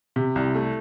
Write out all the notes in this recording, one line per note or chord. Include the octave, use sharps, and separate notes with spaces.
C3
C2
A3